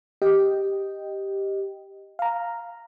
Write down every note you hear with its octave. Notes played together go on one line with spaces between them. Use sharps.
G4 D#5 G5
F5 A#5